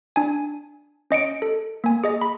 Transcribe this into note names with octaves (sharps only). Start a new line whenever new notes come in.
D4 G#5
C#4 D#5 C#7 D7
A4
A#3 G#5
G#4 D#5 A#6
B5